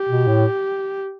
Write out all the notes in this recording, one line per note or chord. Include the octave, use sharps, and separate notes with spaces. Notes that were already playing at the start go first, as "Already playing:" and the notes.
Already playing: G4
B2
A2